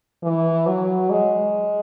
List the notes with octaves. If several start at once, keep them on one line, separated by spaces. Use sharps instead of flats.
E3
F#3
G#3